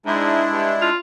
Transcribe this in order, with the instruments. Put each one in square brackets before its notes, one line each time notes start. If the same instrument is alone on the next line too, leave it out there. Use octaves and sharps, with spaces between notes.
[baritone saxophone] G#2 [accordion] G#3 D4 E4
[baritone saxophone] G2
F4